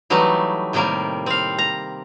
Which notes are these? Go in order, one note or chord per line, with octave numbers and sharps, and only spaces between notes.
E3 F#3 G3 A3 D#4
A2 C3 D#3 G3 A#3
C4 F5
A#5